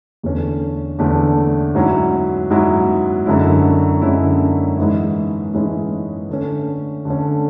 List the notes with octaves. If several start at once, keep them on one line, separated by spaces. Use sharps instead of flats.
E2 D3 A3 C#4
E2 D3 A3 C#4
G#2 F#3 C#4 E4
G#2 F#3 C#4 E4
F#2 D3 G#3 C#4 E4
F#2 D3 G#3 C#4 E4
G#2 E3 G#3 C#4 E4
G#2 E3 G#3 C#4 E4
D3 A3 C#4
D3 A3 C#4